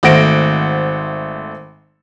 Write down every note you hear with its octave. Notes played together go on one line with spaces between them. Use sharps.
G#1 A3 C5 F#5 A#6 D7